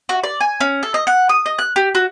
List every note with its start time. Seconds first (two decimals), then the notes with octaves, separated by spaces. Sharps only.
0.09 F#4
0.24 D5
0.40 G#5
0.60 C#4
0.83 A4
0.94 D#5
1.07 F#5
1.29 D#6
1.46 D#5
1.59 F#6
1.76 G4
1.95 F#4